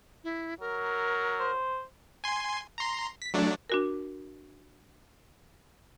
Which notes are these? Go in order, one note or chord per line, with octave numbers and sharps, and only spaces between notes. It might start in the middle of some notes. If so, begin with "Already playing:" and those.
E4
F#3 A#4
C5
G#5 C6
A#5 C6
B6
F#3 A3 D4
D4 F#4 A#4